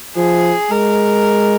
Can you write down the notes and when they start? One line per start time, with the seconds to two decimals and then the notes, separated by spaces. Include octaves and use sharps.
0.16 F3 G#4
0.71 G#3 A#4